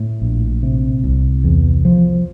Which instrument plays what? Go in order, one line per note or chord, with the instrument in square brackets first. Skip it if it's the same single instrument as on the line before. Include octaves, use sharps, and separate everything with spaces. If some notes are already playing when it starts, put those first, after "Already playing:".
Already playing: [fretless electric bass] A2
A#1
C3
C2
E2
F3